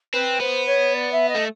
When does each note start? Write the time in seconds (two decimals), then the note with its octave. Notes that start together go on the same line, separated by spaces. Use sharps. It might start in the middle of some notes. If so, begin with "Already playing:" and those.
0.13 C4 B4
0.40 B3 C5
0.66 C#5
0.94 D5
1.12 E5
1.29 D#5
1.35 A3